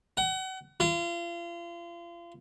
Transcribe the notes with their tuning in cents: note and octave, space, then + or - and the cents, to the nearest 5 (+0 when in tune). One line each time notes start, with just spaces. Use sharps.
F#5 +35
F4 -35